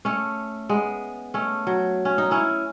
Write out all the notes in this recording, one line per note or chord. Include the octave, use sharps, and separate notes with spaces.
A3 C#4
G#3 B3
A3 C#4
F#3
C#4
D#4
C#4 E4